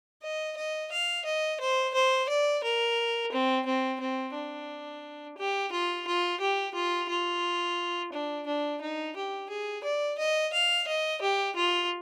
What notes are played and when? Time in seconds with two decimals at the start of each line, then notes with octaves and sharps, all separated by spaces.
0.23 D#5
0.57 D#5
0.92 F5
1.25 D#5
1.60 C5
1.94 C5
2.29 D5
2.64 A#4
3.32 C4
3.66 C4
4.01 C4
4.34 D4
5.38 G4
5.72 F4
6.07 F4
6.40 G4
6.75 F4
7.10 F4
8.13 D4
8.47 D4
8.81 D#4
9.16 G4
9.50 G#4
9.84 D5
10.18 D#5
10.53 F5
10.87 D#5
11.22 G4
11.56 F4